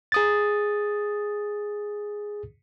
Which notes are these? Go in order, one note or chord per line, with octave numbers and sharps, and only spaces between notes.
G#4 D#6 A6